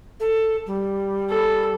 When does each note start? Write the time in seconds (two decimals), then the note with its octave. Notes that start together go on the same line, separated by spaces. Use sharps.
0.20 A4
0.67 G3
1.29 A4